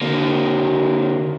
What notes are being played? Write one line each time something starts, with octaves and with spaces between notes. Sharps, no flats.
D3 A#3